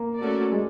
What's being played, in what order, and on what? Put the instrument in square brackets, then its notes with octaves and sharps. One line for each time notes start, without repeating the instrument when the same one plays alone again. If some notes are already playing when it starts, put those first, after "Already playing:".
Already playing: [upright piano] A#3
[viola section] A3 C#4 F#4 A4 D5
[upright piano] G#3